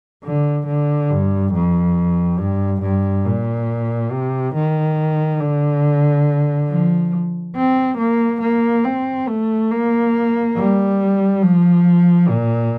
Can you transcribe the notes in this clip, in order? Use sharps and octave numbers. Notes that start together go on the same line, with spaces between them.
D3
D3
G2
F2
G2
G2
A#2
C3
D#3
D3
F3
C4
A#3
A#3
C4
A3
A#3
G3
F3
A#2